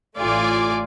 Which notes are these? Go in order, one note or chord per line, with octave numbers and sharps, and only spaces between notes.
A1 A3 F4 D5 G#5